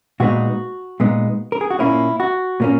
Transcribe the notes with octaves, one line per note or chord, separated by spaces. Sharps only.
A#2 G#3 B3 D#4 F#4
A#2 G#3 B3 D#4
A#4
G#4
F#4
A#2 A#3 C#4 E4
F#4
A#2 A#3 C#4